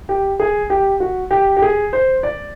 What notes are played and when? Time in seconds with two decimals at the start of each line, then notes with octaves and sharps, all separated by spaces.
0.09 G4
0.40 G#4
0.70 G4
1.00 F#4
1.31 G4
1.57 G4
1.62 G#4
1.93 C5
2.23 D5